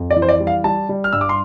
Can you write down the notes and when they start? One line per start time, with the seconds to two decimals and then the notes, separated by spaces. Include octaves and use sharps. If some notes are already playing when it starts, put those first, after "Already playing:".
Already playing: F2
0.11 D5
0.16 E3
0.22 C5
0.29 D5
0.40 G3
0.47 F5
0.64 G3 A5
0.89 G3
1.04 F6
1.13 G2 E6
1.21 D6
1.29 C6